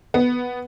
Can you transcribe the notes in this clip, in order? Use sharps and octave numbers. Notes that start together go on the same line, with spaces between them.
B3